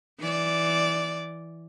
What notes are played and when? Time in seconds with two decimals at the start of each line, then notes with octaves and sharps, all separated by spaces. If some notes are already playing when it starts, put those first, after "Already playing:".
0.20 E3 D5